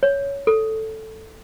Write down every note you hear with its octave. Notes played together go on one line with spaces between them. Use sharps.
C#5
A4